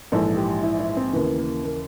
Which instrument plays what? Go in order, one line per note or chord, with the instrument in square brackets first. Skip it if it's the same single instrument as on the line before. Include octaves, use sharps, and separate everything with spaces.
[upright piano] A#1 G#2 E3 A4
G4
E4
E4
C4
D#2 C#3 E3 B3
A#3
A#3